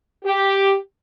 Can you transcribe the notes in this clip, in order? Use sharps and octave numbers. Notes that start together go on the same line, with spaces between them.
G4